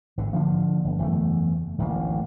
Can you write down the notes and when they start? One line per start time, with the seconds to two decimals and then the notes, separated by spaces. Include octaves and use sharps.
0.17 G#1 D3
0.33 D3 F3 A#3
0.84 G1
0.99 F#1 E2 A3
1.78 D1 A1 D#3 A#3